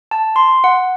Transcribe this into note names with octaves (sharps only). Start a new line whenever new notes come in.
A5
C6
F#5